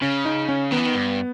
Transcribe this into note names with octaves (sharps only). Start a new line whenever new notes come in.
C#3 C#4
D#4
C#4
D#3 B3
E3
D#3
G2